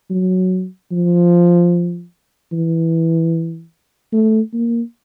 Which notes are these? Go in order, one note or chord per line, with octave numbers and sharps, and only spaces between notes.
F#3
F3
E3
A3
A#3